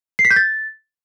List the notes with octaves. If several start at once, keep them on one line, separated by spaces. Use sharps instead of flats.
C7
B6
G6
A6